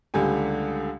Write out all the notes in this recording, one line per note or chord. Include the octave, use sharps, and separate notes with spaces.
C#2 D3 G3 A3 G4 G#5